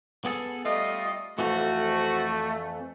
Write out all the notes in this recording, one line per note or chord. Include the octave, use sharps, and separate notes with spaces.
B3 G#4 A4
G3 A3 F4 D#5
F2 C3 E3 A3 F#4